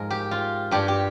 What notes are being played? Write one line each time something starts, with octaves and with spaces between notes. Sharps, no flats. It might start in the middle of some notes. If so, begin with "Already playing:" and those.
Already playing: G#2 F3 G#3 A#4
G4
F4
G2 G3 G4
G4